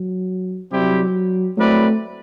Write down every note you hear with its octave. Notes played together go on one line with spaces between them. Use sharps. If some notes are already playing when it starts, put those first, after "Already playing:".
Already playing: F#3
C3 F#3 G3 C4 E4 G4
F#3 A3 C4 E4 B4 D5